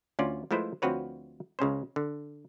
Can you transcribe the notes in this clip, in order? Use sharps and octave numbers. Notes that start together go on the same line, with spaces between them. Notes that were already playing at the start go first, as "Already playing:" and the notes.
D2 C#4 F4 D5
F3 G#3 A3 E4 B4 C5
D2 F3 C4 F#4 B4 C#5
C#2 C#3 C#4 C5
D3